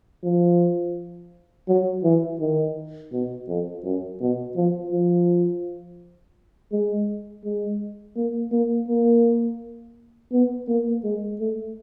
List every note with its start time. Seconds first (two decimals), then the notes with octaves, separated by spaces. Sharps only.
0.24 F3
1.68 F#3
2.04 E3
2.40 D#3
3.12 B2
3.48 F2
3.84 F#2
4.20 B2
4.56 F3
4.92 F3
6.72 G#3
7.44 G#3
8.16 A#3
8.52 A#3
8.88 A#3
10.32 B3
10.68 A#3
11.04 G#3
11.40 A3